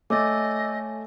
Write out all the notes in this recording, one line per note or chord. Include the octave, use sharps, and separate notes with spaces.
A3 C#5 D#5 E5 G#5 D6 E6 A6